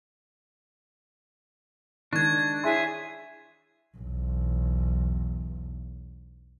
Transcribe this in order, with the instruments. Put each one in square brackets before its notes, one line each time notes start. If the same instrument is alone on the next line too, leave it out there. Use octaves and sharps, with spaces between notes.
[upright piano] D#3 G#3 [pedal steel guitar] D4 [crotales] C#6 G#6
[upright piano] E4 C#5 C6 [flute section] G#4 E5 G#5
[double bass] B1 E2